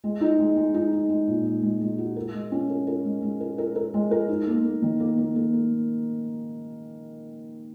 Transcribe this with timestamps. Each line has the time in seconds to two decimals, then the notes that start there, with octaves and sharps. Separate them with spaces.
0.04 G#3
0.21 D#4
0.39 G#3
0.56 G#3
0.74 D#4
0.93 D#4
1.09 G#3
1.27 A#2
1.46 G#3
1.63 G#3
1.81 G#3
1.98 F#4
2.16 A#4
2.34 G#3
2.52 C#4
2.70 A#4
2.87 A#4
3.05 G#3
3.23 G#3
3.40 A#4
3.58 A#4
3.76 A#4
3.94 G#3
4.11 A#4
4.29 D#4
4.47 A#3
4.65 A#3
4.82 D#3
5.00 A#3
5.18 A#3
5.36 A#3
5.53 A#3